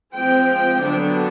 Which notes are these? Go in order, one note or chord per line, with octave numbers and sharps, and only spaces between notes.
F3 G#3 C4 G5
D3 F#3 B3 D4